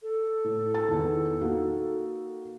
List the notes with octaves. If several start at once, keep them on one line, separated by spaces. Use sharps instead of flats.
A4
A2
A5 A6
E2 D#3
A#3 D#4 F#4